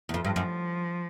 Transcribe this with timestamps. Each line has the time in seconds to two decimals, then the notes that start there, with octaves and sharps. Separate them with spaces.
0.09 E2
0.14 F2 F3
0.25 G2
0.36 F#2